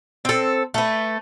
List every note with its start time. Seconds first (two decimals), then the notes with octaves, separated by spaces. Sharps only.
0.25 C4 A4
0.74 A3 B4